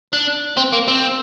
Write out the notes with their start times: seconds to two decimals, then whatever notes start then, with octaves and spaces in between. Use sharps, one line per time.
0.13 D4
0.57 C4
0.72 A#3
0.88 C4